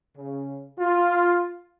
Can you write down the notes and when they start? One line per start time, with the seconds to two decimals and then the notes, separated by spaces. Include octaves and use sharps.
0.17 C#3
0.79 F4